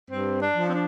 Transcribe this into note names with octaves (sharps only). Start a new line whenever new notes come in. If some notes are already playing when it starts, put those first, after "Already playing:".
G2 C4
D4
F3
C4
D4